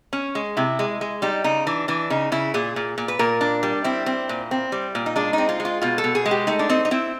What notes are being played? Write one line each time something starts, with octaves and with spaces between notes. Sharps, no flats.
C#4
G#3
C3 E4
G#3
G#3
G3 D#4
C#3 D#4
E3 D4
E3 D4
C#3 D#4
C#3 E4
A#2 G#4
A#2
A#2
B4
A#2 A#4
D4
G3
C4 E4
C4
A#2
C4
G3
A#2
D#4
G#3 D4
C4 D#4
F4
G#3
F4
B2 F4
A4
B2
G#4
G#3
G4
A3 D#4
D4
C4 D#4
D#4
C4 E4